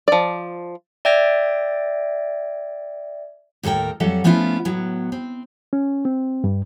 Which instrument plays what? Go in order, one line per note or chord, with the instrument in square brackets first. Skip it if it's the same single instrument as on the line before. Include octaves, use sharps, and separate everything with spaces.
[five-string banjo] F3 D5
[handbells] D5 E5 G5 G#6 A#6
[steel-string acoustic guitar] D#2 A2 A4 A#4 G5
F2 F#3 G3 A4 E5 F#5
F3 A3 B3 C#4 E4 F4
A2 F#3 B3
C4
[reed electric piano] C#4
C4
G2